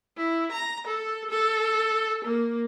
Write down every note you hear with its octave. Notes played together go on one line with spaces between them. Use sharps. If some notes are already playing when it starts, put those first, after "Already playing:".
E4
A#5
A4
A4
A#3